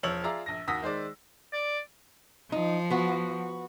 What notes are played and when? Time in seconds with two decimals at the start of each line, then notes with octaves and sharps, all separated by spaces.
0.03 E1 F3 C#5 E6 F#7
0.23 F4 G#4 D5 E5 A#5 E6
0.46 A#1 A#6
0.68 D#2 F#4 D#6 E6 A#6 B6
0.82 D#3 G#3 C5 D5
1.53 D5
2.52 F3 D#4
2.90 B3 F#4